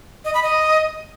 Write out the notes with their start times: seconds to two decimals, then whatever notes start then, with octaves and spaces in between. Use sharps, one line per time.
0.25 D#5
0.34 B5
0.43 D#5